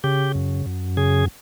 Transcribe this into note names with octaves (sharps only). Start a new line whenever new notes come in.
C#3 G4
F#2
F#2
C#3 G#4